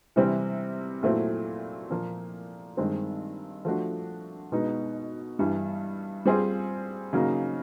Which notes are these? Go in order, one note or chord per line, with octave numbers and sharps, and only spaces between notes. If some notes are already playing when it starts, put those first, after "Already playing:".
C3 E3 G3 C4
A#2 F#3 A3 C4 E4
A#2 F3 A#3
G2 D#3 G#3 C4
F3 A3 D4 F#4
B2 G#3 B3 D#4
G2 E3 G3
G3 C4 F4 G#4 C5
C#3 F#3 A#3 D#4